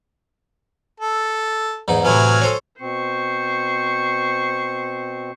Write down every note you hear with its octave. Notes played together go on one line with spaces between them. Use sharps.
A4
E2 G#2 D#4
A2 C3 E3 F#3 G#5 F6
A4 C5 C#5
B2 C4 C5 C#6